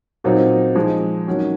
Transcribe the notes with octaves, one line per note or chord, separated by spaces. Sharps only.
A#2 F#3 C4 D#4
F3 G#3 D#4
D#3 F#3 C#4